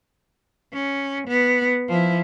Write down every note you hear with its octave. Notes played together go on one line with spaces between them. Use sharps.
C#4
B3
F3 E4